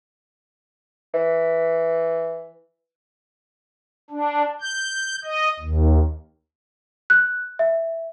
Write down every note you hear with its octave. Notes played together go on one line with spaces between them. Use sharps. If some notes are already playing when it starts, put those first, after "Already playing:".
E3
D4
G6
D#5
D#2
F#6
E5